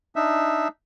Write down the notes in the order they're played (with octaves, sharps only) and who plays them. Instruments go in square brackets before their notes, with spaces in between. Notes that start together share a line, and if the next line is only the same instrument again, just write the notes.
[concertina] D4 D#4 E5